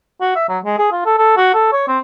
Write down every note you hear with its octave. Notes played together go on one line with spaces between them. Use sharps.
F#4
E5
F#3
G#3
G#4
F4
A4
A4
F#4
A4
C#5
C4